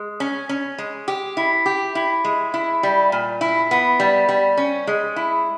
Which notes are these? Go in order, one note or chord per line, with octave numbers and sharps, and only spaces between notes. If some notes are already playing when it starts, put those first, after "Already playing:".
Already playing: G#3
C#4
C#4
G#3
G4
E4
G4
E4
G#3
E4
G3
A#2
E4
B3
G3
G3
C#4
G#3
E4